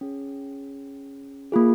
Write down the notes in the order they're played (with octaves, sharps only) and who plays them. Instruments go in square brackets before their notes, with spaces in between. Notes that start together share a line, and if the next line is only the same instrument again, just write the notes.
[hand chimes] C#4 G#4
A#3 F4 G#4